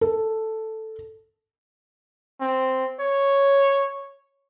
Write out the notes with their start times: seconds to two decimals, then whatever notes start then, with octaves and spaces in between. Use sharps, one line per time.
0.01 A4
2.40 C4
3.00 C#5